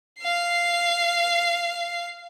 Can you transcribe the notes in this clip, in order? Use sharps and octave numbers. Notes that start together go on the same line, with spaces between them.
F5 C7